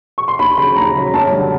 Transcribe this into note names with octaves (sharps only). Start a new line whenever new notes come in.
C#6
C6
D#2 B5
C#3 F#3 B5
D#2 A#5
C#3 F#3
F#2 A5
D3 G3